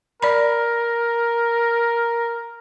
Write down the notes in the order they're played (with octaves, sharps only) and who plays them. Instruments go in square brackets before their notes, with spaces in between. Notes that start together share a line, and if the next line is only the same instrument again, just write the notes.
[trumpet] A#4 [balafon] D5 B5